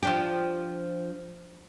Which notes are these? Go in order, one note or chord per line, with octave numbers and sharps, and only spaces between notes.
F3 D4 G4